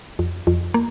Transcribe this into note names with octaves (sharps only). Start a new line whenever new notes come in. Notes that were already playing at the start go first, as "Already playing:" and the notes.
F2
F2
A#3